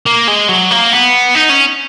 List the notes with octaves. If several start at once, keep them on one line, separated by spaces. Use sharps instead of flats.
A#3
G#3
F#3
A#3
B3
D#4
C#4